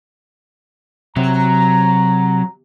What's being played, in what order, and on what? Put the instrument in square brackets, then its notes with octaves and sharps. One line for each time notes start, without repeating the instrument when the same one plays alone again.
[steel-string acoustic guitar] C3 [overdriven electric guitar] F#3 [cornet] A#5